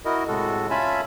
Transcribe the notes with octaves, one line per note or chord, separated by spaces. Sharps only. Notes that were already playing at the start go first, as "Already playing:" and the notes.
E4 F#4 A#4 D#5
A2 C3 G#3 F#4 A4
C#4 F4 E5 G#5 A5 B5